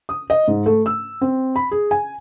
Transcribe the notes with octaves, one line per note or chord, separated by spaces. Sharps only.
D#6
D#5
G#2
A3
E6
C4
B5
G#4
G#5